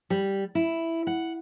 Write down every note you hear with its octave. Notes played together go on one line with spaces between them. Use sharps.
G3
E4
F#5